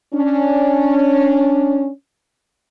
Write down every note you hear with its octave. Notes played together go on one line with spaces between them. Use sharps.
C#4 D4